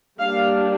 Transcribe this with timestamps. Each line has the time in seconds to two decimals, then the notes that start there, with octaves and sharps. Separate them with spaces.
0.19 G3 A#3 D4 F5